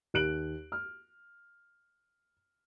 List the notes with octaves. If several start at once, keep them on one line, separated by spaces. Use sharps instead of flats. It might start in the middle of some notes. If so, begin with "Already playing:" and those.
D#2 F#6 D7 F#7
F6